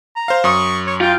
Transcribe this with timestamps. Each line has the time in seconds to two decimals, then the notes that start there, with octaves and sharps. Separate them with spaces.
0.16 A#5
0.28 C5 F5
0.44 F#2 C#6 D#6
0.87 C#5
1.01 F4 G5